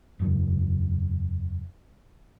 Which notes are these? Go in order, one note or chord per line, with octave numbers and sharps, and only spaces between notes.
E1 F#2 C#3